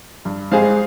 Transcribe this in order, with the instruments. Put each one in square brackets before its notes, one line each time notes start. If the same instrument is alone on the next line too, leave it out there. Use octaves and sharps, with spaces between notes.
[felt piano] G2
[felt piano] G#2 G3 [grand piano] G#4 C5 F5